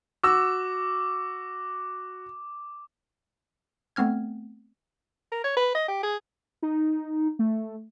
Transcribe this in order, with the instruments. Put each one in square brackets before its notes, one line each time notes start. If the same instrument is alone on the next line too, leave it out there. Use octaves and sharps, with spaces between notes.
[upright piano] F#4 E6 [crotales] D6
[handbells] A3 B3 C4 F6 G#6
[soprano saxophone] A#4
C#5
B4
D#5
G4
G#4
[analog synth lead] D#4
A3